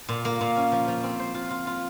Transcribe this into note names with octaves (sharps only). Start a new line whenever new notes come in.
A#2
A#3
A#2
C#4
F3
F3
C4
C5
F4
F4
F4